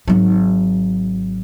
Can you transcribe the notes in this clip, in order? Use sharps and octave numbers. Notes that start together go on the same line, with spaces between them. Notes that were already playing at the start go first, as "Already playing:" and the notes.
G#1 F#3